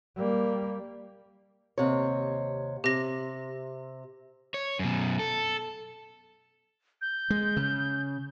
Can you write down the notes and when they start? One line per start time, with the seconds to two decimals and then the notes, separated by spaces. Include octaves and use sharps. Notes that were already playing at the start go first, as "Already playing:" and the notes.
0.16 G3 A#3
1.78 D#2 C3 C#5
2.84 C3 G4 A#6
4.54 C#5
4.79 F#2 B2
5.19 A4
7.01 G6
7.30 G#3
7.57 C#3